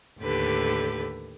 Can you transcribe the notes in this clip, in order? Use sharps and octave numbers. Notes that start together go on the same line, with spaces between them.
D#2 A2 D3 G4 B4